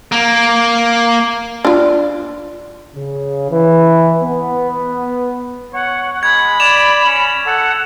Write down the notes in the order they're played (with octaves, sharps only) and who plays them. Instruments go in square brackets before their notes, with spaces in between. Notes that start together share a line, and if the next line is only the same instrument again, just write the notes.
[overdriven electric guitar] A#3
[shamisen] D4 F4
[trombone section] C#3
E3
B3
[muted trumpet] C#5 [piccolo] F#5
[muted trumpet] G#3 [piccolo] B5 [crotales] G#6
[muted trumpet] D5 [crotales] E7 F7
[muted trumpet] C#4
[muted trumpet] A4 [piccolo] F#5